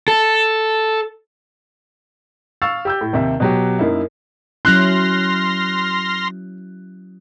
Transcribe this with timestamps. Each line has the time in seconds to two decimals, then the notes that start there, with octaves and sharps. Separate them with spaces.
0.08 A4
2.62 F5 C#6 E6 A6
2.85 G4 E6 G6
3.01 A2
3.13 D#2 C3 E5
3.40 B2 F#3 G4
3.79 F#2 A#3 D#4 E4
4.65 F#3 C#4 E4 C6 F6 F#6 A#6